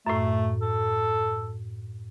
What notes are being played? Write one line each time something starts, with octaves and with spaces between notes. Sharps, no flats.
F#2 A2 A3
A4